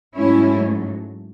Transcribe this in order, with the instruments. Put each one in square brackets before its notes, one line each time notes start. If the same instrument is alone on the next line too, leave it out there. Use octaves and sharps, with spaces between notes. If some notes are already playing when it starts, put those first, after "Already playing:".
[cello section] G#2 F#3 A3 C#4 E4